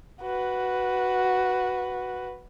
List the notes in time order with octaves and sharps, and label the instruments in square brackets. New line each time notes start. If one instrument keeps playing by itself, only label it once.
[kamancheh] F#4 B4